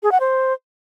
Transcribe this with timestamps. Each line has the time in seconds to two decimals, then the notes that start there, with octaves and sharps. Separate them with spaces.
0.03 G#4
0.12 F#5
0.20 C5